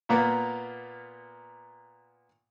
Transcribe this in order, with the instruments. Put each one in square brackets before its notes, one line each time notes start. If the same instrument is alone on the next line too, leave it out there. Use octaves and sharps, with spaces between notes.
[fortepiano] A#2 A#3 B3